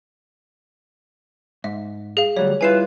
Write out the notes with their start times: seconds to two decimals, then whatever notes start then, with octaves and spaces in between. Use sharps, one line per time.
1.64 G#2 E5
2.17 G#4 F5
2.36 D2 F#3 G3 C#5
2.61 G3 E4 F4 B4 G#5 C7 E7